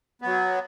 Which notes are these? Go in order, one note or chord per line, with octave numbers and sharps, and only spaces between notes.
F#3 B3